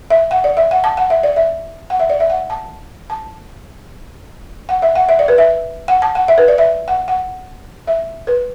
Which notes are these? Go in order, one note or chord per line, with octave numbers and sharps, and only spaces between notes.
E5
F#5
D5
E5
F#5
A5
F#5
E5
D5
E5
F#5
E5
D5
E5
F#5
A5
A5
F#5
E5
F#5
E5
D5
B4
E5
F#5
A5
F#5
E5
B4
D5
E5
F#5
F#5
E5
B4